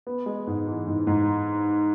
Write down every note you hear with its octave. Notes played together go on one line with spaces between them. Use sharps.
B3
G#3
G#2
E3
G#2
G#2